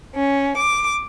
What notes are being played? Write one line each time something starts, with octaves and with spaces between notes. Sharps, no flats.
C#4
D6